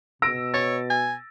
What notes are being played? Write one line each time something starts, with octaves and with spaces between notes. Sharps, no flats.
B2 E6 A#6 D7
C#5 A6
G#5